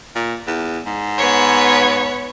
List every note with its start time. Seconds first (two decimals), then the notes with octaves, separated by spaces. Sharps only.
0.15 A#2
0.47 E2
0.86 G#2
1.18 B3 C#5